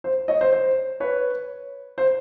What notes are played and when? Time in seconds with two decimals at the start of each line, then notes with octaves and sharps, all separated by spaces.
0.04 C5
0.28 C#5 D#5
0.41 C5
0.53 C5
1.00 B4 C#5
1.98 C5